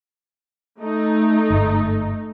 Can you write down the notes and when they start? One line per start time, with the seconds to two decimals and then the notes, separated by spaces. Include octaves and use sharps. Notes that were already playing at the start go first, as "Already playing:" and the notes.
0.79 A3 D#4
1.50 G1 G#2